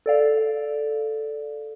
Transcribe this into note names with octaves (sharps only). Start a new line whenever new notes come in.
A4 D5 F5